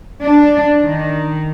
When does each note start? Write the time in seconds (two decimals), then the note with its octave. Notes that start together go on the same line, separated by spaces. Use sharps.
0.22 D4
0.83 D#3